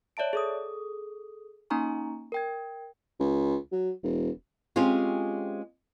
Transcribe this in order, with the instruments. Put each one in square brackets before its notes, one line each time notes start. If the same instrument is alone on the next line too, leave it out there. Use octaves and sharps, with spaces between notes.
[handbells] C#5 D5 E5 A5 D7
G#4 A4 D#6
A#3 C#4 D#4 G#5 A#5 C#6
A#4 G5 G#6
[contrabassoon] C#2
F#3
E1
[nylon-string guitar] G#3 C4 C#4 F4 G4 G#4